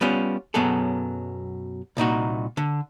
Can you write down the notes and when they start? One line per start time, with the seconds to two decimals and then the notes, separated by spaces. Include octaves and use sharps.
0.01 G3 B3 C#4 F4
0.54 F#2 B2 F#3 B3 G#4 A4
1.97 C2 A#2 D#4 F#4
2.57 D3